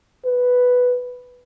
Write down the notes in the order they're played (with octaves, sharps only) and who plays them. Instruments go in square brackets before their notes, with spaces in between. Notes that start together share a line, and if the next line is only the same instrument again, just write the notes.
[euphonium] B4